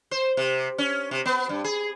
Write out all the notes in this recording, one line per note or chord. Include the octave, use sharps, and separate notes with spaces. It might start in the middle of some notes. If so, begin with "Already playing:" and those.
C5
C3
C#4
C3
B3
G2
G#4